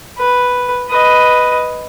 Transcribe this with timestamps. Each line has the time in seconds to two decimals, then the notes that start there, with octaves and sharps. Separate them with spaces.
0.18 B4
0.89 B4 D#5